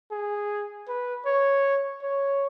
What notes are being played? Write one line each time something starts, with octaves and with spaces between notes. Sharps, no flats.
G#4
B4
C#5
C#5